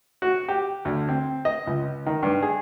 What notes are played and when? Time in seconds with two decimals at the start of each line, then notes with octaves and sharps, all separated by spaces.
0.22 F#4
0.48 G4
0.85 D2
1.09 C4
1.45 D#5
1.67 C#2
2.06 D#3
2.23 G2
2.43 G#4